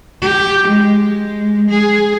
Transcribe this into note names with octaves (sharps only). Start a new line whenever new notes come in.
G4
G#3
G#3
G#4